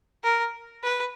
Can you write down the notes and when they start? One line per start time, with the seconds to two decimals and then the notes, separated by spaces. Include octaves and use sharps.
0.24 A#4
0.84 B4